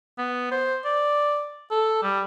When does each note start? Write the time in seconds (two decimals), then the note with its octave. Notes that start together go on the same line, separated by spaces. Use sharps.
0.18 B3
0.52 C5
0.85 D5
1.71 A4
2.03 G3